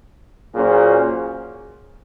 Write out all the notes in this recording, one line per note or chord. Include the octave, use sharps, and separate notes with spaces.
A#2 F#3 C#4 G#4 C5